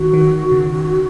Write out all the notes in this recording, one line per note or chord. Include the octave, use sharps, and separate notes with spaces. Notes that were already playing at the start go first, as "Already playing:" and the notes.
Already playing: D#3 F#4
D#3
C#3